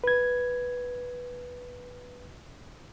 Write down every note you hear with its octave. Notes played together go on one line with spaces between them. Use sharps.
B4 G#6